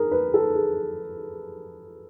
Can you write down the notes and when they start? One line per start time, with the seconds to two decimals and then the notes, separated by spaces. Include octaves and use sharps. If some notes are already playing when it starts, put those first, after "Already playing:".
Already playing: G#4 A#4
0.11 B4
0.34 A4
0.55 G#4